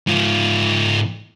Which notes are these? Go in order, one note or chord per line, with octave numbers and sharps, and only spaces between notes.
G#2 F4